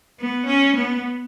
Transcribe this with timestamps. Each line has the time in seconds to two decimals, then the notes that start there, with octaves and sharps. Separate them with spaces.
0.20 B3
0.47 C#4
0.76 B3